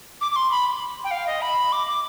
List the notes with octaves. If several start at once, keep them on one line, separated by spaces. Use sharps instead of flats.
D6
D6
C6
B5
G5
F5
D#5
B5
D6
D6